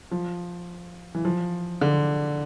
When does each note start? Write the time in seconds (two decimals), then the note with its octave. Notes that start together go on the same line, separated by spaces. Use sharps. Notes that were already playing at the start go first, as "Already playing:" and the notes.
0.11 F3
1.15 E3
1.25 F3
1.81 D3